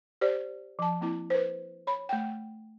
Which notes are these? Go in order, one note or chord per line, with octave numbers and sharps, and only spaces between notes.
G4 C5 D5
F3 A5
A#3 C4 E4
B4 C5
C#5 B5
A3 F#5 G5